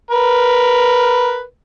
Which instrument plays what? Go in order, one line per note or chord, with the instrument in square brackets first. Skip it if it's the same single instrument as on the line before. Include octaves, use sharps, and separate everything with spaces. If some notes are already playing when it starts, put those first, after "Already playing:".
[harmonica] A#4 B4